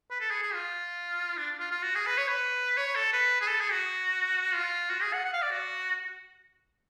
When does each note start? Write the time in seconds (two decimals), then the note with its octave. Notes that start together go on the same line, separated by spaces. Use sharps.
0.11 B4
0.20 A4
0.31 G#4
0.42 G#4
0.54 F4
1.37 D4
1.60 F4
1.72 F4
1.83 F#4
1.95 G#4
2.07 B4
2.18 C#5
2.28 B4
2.77 C#5
2.96 A4
3.13 B4
3.41 G#4
3.48 A4
3.60 G#4
3.72 F#4
4.54 F4
4.90 F#4
5.02 G#4
5.13 F#5
5.25 F#5
5.34 F5
5.42 D5
5.51 F#4